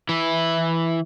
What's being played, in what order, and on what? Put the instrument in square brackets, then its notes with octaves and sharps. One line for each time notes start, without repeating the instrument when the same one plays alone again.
[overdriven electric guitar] E3 E4